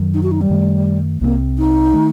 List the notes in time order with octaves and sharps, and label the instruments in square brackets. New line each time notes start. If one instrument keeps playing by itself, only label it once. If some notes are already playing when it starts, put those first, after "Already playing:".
Already playing: [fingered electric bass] F#2 D#3 F#3
[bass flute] D#4
F#4
D#4
G3
[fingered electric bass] F#2 D#3 A3
[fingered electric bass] C2 C3 G3 C4 [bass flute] A#3
[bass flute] D#4
[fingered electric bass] D#3 A3